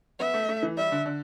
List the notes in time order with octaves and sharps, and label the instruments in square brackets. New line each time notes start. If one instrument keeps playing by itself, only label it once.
[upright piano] B3 [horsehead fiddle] E5
[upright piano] A3
A3
E3
[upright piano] G3 [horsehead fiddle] E5
[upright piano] D3
D3